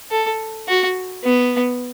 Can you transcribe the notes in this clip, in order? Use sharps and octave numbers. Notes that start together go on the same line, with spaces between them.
A4
F#4
B3